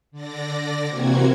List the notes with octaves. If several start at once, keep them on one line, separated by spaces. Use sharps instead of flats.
D3 D5 A#6
C3 E3 A#3 C4 F#4 G#6